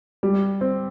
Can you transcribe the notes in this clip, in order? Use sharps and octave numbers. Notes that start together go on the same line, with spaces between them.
G3
C4